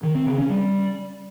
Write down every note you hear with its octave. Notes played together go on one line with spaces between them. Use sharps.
D#3
C4
C#3
C#4
G3